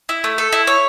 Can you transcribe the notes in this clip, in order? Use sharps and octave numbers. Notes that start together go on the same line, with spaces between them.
E4
A3
A4
E4
C#5